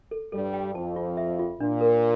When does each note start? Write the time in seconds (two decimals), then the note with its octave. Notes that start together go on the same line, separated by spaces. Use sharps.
0.11 A4
0.32 G2 G3 A4
0.54 G5
0.75 F2 F3 A5
0.96 F4
1.17 E5
1.39 F4
1.60 A#2 D4
1.81 A#4